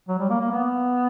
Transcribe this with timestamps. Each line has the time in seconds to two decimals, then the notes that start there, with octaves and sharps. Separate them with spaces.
0.08 F#3
0.19 G3
0.30 A#3
0.40 A#3
0.51 B3